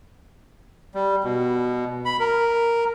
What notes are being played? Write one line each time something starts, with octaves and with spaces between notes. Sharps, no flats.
G3
B2
B5
A#4